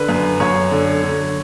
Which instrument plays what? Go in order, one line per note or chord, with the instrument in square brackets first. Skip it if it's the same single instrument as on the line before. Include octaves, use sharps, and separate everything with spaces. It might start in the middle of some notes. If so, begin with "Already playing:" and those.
Already playing: [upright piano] D3 B4
F#2
F#2 C#5
D3
D3